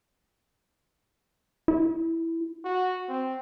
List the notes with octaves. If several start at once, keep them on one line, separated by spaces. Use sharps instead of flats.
E4
F#4
C4